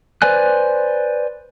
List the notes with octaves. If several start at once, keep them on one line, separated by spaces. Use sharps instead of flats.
B4 C5 D5 G#5 F#6